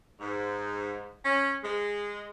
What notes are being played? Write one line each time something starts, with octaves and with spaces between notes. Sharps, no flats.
G#2
C#4
G#3